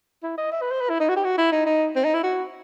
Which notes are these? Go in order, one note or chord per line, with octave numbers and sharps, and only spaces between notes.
E4
D#5
E5
B4
C5
B4
E4
D#4
F#4
G4
F#4
E4
D#4
D#4
C4
D#4
E4
F#4